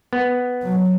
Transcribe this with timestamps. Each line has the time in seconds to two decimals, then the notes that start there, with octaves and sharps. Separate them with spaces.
0.13 B3
0.63 F#3